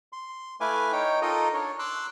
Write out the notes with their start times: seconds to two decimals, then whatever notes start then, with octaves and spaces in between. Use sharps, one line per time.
0.13 C6
0.60 A3 E4 B4 F5 G#5 D6
0.92 D#4 C#5 G5
1.22 D#4 F4 A4 A#4 D#5
1.54 D4 C#5
1.79 C6 D6 E6 F#6